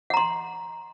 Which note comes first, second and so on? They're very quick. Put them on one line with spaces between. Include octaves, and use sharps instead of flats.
F#5 A#5 C6